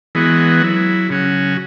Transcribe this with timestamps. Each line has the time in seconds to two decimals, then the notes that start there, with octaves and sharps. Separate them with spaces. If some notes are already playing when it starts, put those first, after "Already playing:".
0.15 E3 G#3 B3 F#4
0.62 F#3 E4
1.10 C#3 F#3 C#4 F#4